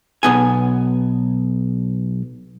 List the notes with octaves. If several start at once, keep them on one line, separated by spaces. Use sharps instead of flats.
B1 B3 G#5